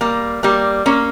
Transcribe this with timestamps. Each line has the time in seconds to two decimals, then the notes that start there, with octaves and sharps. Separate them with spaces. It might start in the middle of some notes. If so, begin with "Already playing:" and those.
0.01 G3 A#3
0.43 G3 A#3
0.86 A#3 C#4